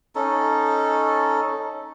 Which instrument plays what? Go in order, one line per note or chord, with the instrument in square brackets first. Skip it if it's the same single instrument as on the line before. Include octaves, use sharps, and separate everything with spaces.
[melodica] C#4 D#4 A4